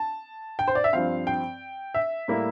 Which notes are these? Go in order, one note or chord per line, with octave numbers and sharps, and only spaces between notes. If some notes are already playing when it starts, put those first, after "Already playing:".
Already playing: A5
G5
C5
D5
E5
G2 F3 C4 F5
G5
E5
A2 G3 A#3 E4